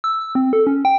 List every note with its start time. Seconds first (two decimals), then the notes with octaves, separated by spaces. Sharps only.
0.04 E6
0.21 E6
0.35 C4
0.53 A4
0.67 C#4
0.85 G5